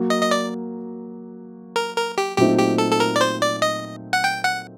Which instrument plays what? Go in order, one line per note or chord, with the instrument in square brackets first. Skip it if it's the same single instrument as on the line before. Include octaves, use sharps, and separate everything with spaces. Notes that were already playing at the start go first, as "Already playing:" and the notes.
Already playing: [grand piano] F#3 A#3 F#4
[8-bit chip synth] D#5
D#5
D5
A#4
A#4
G4
[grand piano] A#2 F#3 A3 C4 D#4 [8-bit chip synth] G4
[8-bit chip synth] G4
A4
A4
A#4
D5
C5
D5
D#5
F#5
G5
F#5